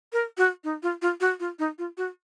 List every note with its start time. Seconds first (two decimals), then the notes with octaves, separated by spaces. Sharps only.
0.13 A#4
0.38 F#4
0.64 D#4
0.83 F4
1.02 F4
1.21 F#4
1.40 F4
1.59 D#4
1.78 F4
1.97 F#4